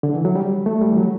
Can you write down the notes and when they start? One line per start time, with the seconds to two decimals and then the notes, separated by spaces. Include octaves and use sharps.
0.03 D3
0.14 E3
0.25 F#3
0.35 G3
0.66 A3
0.81 G3
0.91 E3
0.97 F#3